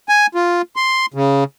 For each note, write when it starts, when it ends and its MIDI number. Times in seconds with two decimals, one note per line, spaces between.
0.09 0.26 80
0.35 0.62 65
0.76 1.06 84
1.14 1.44 49